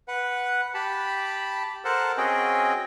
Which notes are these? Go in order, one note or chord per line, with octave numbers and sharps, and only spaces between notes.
B4 F#5
G4 A5 B5
A4 A#4 C5 F#5 A5
C4 C#4 F#4 G#4 D#5 G5